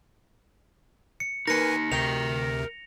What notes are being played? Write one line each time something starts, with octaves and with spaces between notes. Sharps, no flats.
C#7
A#3 D#4 A#4 B4 G#5 A#6 C#7
D2 C3 A#4 G5 F7